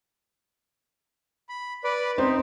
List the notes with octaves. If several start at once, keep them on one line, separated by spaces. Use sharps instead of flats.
B5
B4 D5 B5
C4 D#4